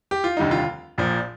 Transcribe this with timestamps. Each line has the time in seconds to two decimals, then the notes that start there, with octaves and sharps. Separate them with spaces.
0.11 G4
0.24 F4
0.37 F1 D#2 D3 G3 D#4
0.51 F4
0.98 A#1 A#2 F3